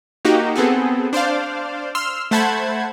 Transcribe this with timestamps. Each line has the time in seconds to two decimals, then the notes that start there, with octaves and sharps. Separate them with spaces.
0.25 A#3 D#4 F#4 G4
0.56 B3 C4 G#4 A4
1.13 D4 C5 D5 F5
1.95 C6 E6 F6
2.31 A3 C5 F#5 A5 B5 G#6